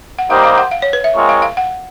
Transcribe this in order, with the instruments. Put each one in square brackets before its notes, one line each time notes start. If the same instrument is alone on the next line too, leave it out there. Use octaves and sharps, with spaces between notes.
[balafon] F#5
[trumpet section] G3 A#3 D#4 G4 C5 [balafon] F5
[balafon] F5
F#5
F5
C#5
B4
E5
[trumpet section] G#3 C4 F4 A#4 C#5
[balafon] F5
F5
F#5